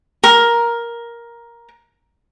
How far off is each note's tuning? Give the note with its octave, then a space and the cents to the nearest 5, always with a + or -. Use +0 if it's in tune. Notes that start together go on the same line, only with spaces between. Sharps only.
A#4 +10